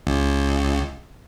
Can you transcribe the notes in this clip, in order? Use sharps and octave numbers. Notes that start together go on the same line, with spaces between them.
C#2